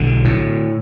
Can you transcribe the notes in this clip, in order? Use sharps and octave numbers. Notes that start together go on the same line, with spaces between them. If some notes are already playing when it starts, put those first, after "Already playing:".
Already playing: B1 D3
A2